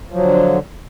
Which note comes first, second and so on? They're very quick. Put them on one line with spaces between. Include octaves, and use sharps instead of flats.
F3 F#3 D3